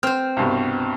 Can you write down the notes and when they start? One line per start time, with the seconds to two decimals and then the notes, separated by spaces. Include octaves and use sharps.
0.03 C4 C5 F6
0.37 C2 G2 B2